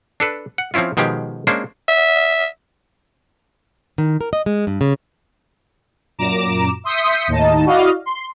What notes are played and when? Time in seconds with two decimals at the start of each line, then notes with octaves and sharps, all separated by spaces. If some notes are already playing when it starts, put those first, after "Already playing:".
0.20 D4 A4 B4
0.58 F#5
0.74 F3 C4 C#4 E4 F4
0.97 B2 D#3 F3 G#3 G4
1.47 G#3 A#3 C#4 D4 C5
1.88 E5
3.98 D#3
4.21 A#4
4.33 D#5
4.46 G#3
4.67 G2
4.81 C#3
6.18 F#2 A#2 A#5 D6 E7
6.84 E5 C6 D#6 G6 B6 C#7
7.28 D#2 A2 D#4 D#5 A5
7.65 E4 F#4 D5 D#5 F5
8.06 C6